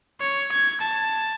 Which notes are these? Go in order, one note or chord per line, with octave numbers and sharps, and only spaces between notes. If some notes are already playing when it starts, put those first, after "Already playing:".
C#5
G#6
A5